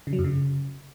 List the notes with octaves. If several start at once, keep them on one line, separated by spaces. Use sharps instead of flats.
C#3
F#3
F#2
C#3